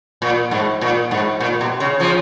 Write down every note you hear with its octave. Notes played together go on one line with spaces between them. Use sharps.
A#2
G#2
A#2
G#2
A#2
B2
C#3
C#3 F3